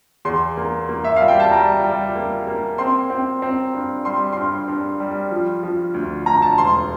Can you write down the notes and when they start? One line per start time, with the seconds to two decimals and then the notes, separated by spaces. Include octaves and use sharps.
0.25 E2 C6
0.57 A#3
0.89 A#3
1.04 E5
1.16 G3 F5
1.28 G5
1.40 A5
1.52 G3 A#5
1.84 G3
2.15 A#3
2.47 A#3
2.78 C4 C6
3.10 C4
3.42 C4
3.73 G2
4.05 G3 C6
4.32 G2 C6
4.68 G2
5.00 G3
5.31 F3
5.63 F3
5.94 D2
6.26 D2 A#5
6.42 A5
6.58 E1 C6